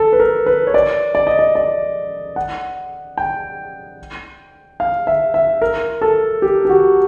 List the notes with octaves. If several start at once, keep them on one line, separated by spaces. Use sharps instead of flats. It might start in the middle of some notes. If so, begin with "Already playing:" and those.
Already playing: A4
B4
A#4
B4
C#5
D5
D5
D#5
D5
D5
F#5
G5
F5
E5
E5
A#4
A4
G4
G4
F#4